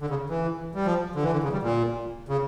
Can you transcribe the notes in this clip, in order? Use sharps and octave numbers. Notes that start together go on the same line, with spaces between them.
D3
C#3
E3
G3
F3
D3
E3
D3
C#3
G3
A#2
C#3